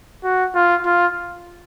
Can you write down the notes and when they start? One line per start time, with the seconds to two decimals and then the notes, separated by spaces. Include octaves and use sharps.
0.24 F#4
0.55 F4
0.85 F4